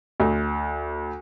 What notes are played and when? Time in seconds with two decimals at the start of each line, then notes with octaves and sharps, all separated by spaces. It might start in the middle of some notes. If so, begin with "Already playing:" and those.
0.20 D2